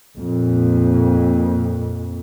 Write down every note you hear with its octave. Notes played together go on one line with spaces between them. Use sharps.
F2 A#2